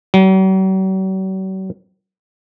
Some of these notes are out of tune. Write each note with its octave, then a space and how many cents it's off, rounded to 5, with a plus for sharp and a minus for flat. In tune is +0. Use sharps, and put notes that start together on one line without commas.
F#3 +45